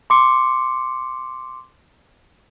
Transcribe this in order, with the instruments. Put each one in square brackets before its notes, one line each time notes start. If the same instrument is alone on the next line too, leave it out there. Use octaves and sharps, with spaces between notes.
[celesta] C6 D6 C#7